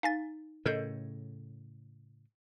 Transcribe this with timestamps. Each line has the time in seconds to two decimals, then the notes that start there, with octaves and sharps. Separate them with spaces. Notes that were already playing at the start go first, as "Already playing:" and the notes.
0.03 D#4 F5 G#5 A6
0.66 A2 C#3 A4 A#4 D#5 G6